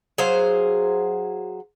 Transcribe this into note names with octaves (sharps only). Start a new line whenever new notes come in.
F#3 G#4 C5 F5